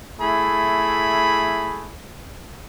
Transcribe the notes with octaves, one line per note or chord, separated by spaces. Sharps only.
A3 E4 G#4 B5